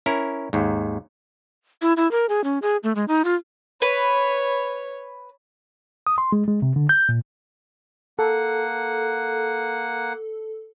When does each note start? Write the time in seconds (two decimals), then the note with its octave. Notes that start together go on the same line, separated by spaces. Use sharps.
0.06 C#4 E4 A#4
0.53 D#2 G#2
1.82 E4
1.97 E4
2.11 A#4
2.29 G#4
2.44 C#4
2.62 G#4
2.84 A3
2.95 G#3
3.08 D#4
3.25 F4
3.82 B4 C#5
6.07 D#6
6.18 C6
6.32 G#3
6.48 G#3
6.62 C3
6.76 D3
6.89 G6
7.09 A#2
8.19 A#3 A4 F#5